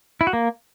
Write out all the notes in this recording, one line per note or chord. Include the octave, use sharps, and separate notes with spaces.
E4
F#4
A#3